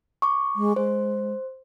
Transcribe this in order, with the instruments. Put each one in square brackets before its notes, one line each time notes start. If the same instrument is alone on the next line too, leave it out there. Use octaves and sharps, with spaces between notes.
[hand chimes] C#6 D6
[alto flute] G#3
[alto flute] G#3 [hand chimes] C5